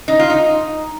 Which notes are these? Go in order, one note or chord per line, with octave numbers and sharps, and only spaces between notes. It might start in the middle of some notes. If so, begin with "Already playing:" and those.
D#4
F4
D#4